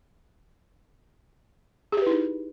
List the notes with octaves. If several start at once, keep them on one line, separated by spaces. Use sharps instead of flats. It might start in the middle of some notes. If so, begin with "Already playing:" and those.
D#4 E4 G4 G#4 B4